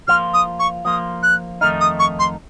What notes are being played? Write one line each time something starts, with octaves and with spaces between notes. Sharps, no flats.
F3 A#3 F4 F6
D#6
C#6
F3 A#3 F4 D#6
F#6
F2 D#3 A3 D#4 F6
D#6
C#6
C6